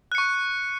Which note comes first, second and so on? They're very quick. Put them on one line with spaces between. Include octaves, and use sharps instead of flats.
F#6 C#7 C#6